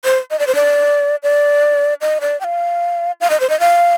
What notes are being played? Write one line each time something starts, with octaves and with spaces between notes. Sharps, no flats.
C5
D#5
D5
C5
D5
D5
D#5
D5
G5
F5
F5
D#5
C5
D#5
F5